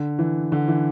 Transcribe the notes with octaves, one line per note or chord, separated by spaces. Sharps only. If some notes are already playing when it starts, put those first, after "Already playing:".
Already playing: D3
E3
D3
E3